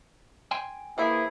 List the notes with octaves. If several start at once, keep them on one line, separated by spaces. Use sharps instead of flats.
G5 G#5 C6
E3 A#3 E4 G#4 C5 E5